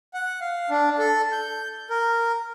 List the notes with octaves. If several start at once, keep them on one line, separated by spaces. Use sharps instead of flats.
F#5
F5
D4
A4
G6
A#4